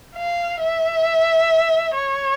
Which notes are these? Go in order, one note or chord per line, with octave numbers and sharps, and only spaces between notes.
F5
E5
C#5